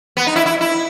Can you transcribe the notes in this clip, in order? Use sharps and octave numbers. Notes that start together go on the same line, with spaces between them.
B3
D#4
E4
E4
E4